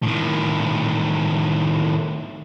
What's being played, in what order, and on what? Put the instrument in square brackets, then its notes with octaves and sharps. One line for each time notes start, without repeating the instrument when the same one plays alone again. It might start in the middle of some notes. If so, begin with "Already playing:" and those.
[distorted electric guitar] A2 D#3